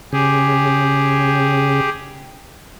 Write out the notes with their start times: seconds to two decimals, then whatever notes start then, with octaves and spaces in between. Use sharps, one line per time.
0.13 C#3 G4 G#4